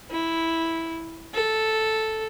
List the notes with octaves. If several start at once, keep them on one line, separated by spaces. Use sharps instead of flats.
E4
A4